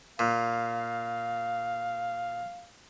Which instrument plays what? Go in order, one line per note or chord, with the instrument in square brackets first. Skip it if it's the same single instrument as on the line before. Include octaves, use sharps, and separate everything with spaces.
[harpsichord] A#2 [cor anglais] F5